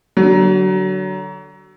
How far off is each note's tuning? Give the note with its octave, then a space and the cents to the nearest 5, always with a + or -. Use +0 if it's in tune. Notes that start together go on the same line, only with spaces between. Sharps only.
D3 +0 F#3 +30